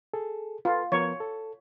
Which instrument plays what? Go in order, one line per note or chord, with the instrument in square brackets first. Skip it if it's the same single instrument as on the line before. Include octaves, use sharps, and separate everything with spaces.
[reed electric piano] G#4 A4
[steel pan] F4 [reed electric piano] A4 B4
[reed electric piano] F3 B3 A#4 [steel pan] C#5
[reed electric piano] A4